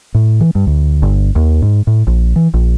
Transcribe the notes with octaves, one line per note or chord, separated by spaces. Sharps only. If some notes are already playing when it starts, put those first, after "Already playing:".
A2
E3
G2
D2
G1
D#2
G#2
A2
A#1
E3
A#1